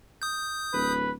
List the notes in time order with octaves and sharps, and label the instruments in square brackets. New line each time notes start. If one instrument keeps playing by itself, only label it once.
[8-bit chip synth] D#6 G6
[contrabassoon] D1 [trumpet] B4